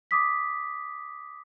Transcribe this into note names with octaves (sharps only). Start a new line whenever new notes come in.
D6 D#6 B6